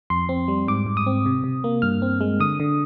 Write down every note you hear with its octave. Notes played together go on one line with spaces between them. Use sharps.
F2 C6
C4
G3
G#2 D6
G#2
D#6
C4
C3
C3
A#3
G2 F6
C4
G#3
D3 D#6
D3